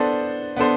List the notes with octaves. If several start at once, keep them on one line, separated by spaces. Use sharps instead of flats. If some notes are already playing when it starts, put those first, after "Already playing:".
Already playing: B3 D4 A4 C5
B3 D4 A4 C5